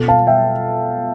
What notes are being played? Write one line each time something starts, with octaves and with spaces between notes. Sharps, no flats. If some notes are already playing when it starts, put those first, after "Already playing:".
Already playing: B2 B3 F4 A4
F5 A5
E5 G5